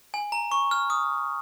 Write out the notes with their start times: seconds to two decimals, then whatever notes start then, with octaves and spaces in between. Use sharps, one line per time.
0.14 G#5
0.32 A#5
0.52 C#6
0.71 F6
0.90 D#6